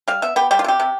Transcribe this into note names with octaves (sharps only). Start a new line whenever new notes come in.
G3 F5
B3 E5
B3 G4
G3 G4
F4
C3 G4
C3